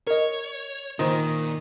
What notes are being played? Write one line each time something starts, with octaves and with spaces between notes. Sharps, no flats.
A#4 C#5 D#5
A#2 D#3 F4 C5